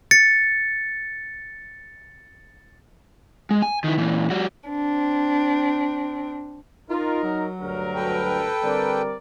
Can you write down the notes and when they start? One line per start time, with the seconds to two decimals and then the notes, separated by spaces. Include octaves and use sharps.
0.11 A6 C#7
3.51 G#3
3.62 G#5
3.84 D#3 E4
3.98 A#2 E3
4.30 G3 F#4
4.70 C4 D4
6.90 D#4 F4 A#4
7.23 F#3
7.61 D2 G2 A#4
7.95 A4 B4 G5
8.64 D3 G3 C4 A#4 D5